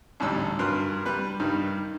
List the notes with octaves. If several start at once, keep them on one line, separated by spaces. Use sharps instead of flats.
A1 D2 G#2 G3 C#5 E6
G2 F#3 A#4 B4 C6
G3 B4
G2 D#3 G3 D#4